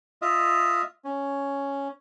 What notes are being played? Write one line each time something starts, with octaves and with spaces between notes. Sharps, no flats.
F4 D#5 E5
C#4